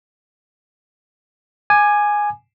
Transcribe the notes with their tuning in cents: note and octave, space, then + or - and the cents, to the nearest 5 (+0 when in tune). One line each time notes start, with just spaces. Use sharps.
G#5 +0 D6 +25